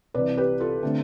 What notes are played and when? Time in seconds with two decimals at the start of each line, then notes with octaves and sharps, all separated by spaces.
0.14 C2 C3 E3 B4 D5
0.37 G4 B4
0.60 F4 A4
0.83 D3 A3 C4